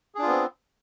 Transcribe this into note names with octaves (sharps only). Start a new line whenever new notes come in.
B3 C4 D4 F4 G#4